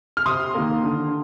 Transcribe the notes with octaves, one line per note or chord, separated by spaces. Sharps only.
F6
C3 C6 D#6
D#3 A#3
D3